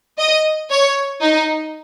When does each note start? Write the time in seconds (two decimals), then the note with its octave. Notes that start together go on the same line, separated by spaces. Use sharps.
0.19 D#5
0.70 C#5
1.21 D#4